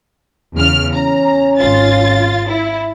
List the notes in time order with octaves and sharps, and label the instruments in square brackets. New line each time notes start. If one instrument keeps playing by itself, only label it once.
[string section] E2 C#3 F6
[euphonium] C#4 [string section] A#5
[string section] G#1 F4 A6
E4